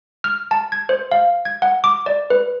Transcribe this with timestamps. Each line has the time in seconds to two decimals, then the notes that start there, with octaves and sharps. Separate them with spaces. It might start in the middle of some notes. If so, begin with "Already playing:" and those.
0.24 F6
0.51 A5
0.72 G#6
0.89 C5
1.12 F5
1.45 G#6
1.62 F#5
1.84 D6
2.06 D5
2.30 B4